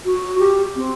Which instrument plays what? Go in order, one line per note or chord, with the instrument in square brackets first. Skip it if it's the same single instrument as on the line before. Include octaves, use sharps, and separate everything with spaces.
[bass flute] F#4
G4
C4